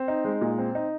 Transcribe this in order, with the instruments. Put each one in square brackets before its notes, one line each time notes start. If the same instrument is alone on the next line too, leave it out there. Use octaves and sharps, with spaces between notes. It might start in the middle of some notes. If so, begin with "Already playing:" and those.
Already playing: [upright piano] C4
D#4
G#3
A#2
C4
D#4